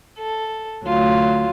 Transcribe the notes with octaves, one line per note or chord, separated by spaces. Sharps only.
A4
D2 F#3 F4